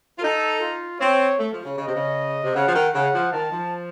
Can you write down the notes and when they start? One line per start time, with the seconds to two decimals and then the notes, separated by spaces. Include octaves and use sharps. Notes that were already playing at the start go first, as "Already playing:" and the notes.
0.18 F4
0.22 D#4 A4
0.61 F4
1.00 C4 C#5
1.39 A3
1.52 F3
1.64 C#3
1.78 C#3 D#5
1.86 C3
1.95 C#3
2.44 C3
2.55 C#3 F#5
2.66 F3
2.75 D#3
2.94 C#3 F#5
3.14 F3
3.33 D#3 A5
3.52 F3